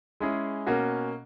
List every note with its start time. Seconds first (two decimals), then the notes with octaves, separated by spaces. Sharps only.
0.20 G#3 C#4 E4 G#4
0.67 B2 A#3 C#4 F#4